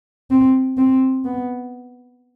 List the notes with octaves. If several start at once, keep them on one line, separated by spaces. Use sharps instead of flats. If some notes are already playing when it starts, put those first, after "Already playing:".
C4
C4
B3